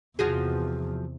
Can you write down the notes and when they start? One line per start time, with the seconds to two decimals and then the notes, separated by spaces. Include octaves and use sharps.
0.19 E2 C3 F3 F#4 G#4